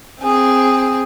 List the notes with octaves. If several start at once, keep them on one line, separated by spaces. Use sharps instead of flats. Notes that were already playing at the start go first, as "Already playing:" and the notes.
C4 G#4